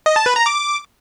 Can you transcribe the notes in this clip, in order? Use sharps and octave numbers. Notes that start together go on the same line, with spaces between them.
D#5
A5
B4
A#5
D6